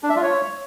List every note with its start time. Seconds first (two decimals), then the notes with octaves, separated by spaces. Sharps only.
0.03 D4
0.10 E5
0.16 F4
0.22 C#5